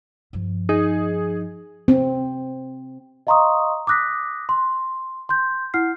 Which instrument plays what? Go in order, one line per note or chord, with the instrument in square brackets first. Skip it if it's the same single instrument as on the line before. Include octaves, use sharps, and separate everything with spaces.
[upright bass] G2 F3
[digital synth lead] D#4 [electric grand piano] G#4
[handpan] C4
[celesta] D#5 F5 A#5 C6 C#6 D#6
D6 D#6 F#6 A#6 B6
C6
C6 G6
E4 F#5 F6 C7